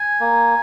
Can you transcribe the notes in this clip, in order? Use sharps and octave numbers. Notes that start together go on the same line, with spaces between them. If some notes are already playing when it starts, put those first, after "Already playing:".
Already playing: G#5
A#3